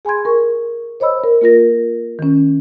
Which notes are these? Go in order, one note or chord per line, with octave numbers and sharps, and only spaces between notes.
G#4 G#5 B5 C6 G#6
A#4 C#6
C5 C#5 D#5 B5 E6
A#4
A#3 F4 A#4 A#6
D#3 C#4